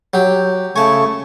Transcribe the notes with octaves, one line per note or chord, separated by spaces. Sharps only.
F#3 G4
C#3 A3 G#5 A5 C#6